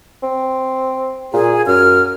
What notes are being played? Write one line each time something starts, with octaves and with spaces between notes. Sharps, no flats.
C4
A#2 G#4
F#2 F6